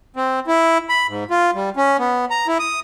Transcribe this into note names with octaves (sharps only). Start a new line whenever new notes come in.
C4
E4
B5
G#2
F4
G3
C#4
B3
A#5
E4
D#6